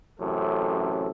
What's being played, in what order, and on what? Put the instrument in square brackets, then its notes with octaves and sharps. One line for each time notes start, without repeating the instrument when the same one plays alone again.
[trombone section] A1 F#2 C3 A4